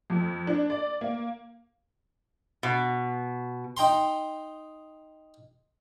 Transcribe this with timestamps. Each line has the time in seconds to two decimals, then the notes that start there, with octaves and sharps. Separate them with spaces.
0.10 F2
0.47 D4
0.70 D5
1.01 A#3
2.63 B2
3.77 D#4 G5 A#5 C6